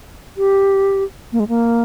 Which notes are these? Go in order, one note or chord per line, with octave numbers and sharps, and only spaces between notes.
G4
A#3
G#3
A#3